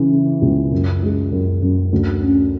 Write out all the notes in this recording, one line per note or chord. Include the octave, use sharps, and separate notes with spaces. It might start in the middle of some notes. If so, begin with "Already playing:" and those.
Already playing: C#3 E3
C#3
C#2
F#2
G#3
F#2
F#2
D2
C#4